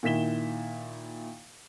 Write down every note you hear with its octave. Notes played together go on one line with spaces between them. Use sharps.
A#2 D#3 E4 B6 E7 G7